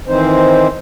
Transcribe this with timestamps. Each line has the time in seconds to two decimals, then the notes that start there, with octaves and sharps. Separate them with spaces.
0.08 D#3 E3 C4 D#4 C5